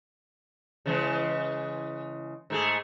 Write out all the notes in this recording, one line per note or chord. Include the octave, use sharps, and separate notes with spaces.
C#3 E3 G#3
G#2 A3 G#4